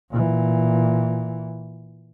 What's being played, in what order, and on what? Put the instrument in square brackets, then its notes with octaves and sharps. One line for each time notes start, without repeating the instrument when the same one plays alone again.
[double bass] A#2 E3